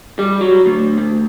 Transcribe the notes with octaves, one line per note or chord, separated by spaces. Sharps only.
G3
F#3
D2
D2